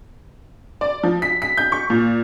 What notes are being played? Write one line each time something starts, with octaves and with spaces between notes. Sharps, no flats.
D5
F3
B6
B6
G6
C#6
A#2